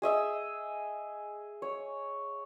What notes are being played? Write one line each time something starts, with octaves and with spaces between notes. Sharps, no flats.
G#4 D#5 E5 E6
C#5